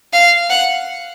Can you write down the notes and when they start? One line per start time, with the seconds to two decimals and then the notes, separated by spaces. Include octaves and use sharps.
0.13 F5
0.50 F#5